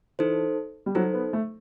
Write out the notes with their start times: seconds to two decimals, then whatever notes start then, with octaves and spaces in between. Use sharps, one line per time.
0.19 E3 D#4 A4 C5
0.86 G3
0.95 F#3 D#4 A4 C5
1.14 B3
1.33 A3